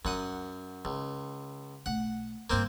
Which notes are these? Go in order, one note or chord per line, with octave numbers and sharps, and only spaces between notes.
F#2 D#4 F4 F#5 D#6
C#2 D#4
B1 A3 F#5
G2 D3 A#3 C4 C5